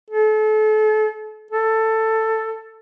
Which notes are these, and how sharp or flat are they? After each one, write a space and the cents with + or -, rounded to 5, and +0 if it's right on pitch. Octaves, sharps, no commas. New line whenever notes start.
A4 -35
A4 +10